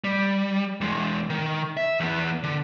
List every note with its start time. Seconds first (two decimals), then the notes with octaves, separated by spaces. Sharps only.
0.04 G3
0.81 E2 G#3
1.30 D#3
1.77 E5
2.00 E2 B3
2.43 D3